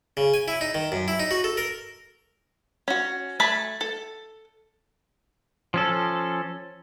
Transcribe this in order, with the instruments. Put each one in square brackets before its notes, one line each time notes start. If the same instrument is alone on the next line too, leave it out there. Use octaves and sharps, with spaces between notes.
[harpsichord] C#3
G#5
E4
D#4
D#3
F#2
E4
D#4
F#4
A4
A#4
[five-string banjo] C#4 F#4
A3 G#5 A5 B5
A4
[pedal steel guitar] F3 C#4 A4